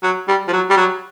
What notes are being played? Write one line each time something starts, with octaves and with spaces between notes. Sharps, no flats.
F#3
G3
F3
F#3
G3
F#3